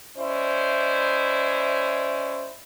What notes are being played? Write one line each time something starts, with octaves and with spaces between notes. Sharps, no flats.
C#4 E4 C5 D5 D#5